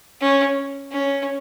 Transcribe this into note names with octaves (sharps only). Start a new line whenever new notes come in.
C#4
C#4